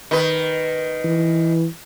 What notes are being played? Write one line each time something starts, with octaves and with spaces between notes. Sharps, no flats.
D#3 B4
E3